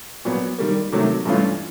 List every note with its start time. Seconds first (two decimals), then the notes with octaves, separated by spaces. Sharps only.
0.25 A#2 F#3 B3
0.58 D#3 G3 A#3
0.92 C3 D#3 F#3 A3
1.25 G2 E3 A3 C#4 F4